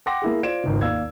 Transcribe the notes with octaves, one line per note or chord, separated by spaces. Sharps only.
F#5 G5 C6 D6 A#6
A#3 E4 G#4
F4 C5 D5 G#6 D7 E7
G#1 C#2 D#3
D#2 D5 F5 E6 G#6